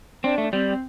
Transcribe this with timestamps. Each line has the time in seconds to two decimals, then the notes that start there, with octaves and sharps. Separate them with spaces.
0.24 C4 D4
0.38 A3
0.52 G3 C4